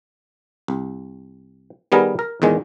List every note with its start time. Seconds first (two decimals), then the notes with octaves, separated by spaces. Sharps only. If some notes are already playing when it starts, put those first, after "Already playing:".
0.68 C2
1.92 D#3 G3 B3 G#4 A#4
2.19 A#4
2.42 E2 A#2 D#3 G#3